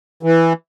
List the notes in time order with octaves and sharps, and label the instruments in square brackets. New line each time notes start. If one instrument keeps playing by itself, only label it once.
[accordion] E3